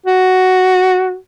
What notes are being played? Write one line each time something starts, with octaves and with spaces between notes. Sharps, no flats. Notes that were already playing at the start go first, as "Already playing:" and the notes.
F#4